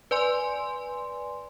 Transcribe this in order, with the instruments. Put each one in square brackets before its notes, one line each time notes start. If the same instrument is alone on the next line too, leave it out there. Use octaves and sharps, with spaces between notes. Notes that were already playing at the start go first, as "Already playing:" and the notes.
[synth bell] B4 D5 G#5 C6